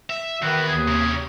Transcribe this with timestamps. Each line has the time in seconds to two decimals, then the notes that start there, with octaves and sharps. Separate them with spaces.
0.10 E5
0.42 E2 D#3 B3 F#4
0.68 D#2 G#4
0.88 C3 C#4